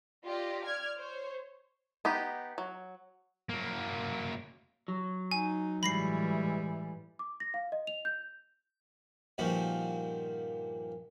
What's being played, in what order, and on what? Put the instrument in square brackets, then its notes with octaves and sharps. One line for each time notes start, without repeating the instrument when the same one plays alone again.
[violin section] F4 G4 D5 D#5
D5 F6 G#6
C5 C#5
[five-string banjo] B3 D#4 G4
F#3
[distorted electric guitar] F#3 A#3
[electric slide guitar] F#3
[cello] D#4 [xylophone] G#5
[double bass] A2 E3 [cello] G3 G#3 [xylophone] B5 A#6 C7
[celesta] D6
A#6
F5
D#5
F7
G6
[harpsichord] G2 A#2 D#3 F3 F#4